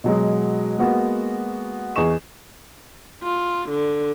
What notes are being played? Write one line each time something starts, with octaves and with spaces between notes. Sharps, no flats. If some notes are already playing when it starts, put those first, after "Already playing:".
B2 F#3 G#3
G#3 A#3 B3 F#4
E2 G#4 D#5 C#6 E7
F4
D3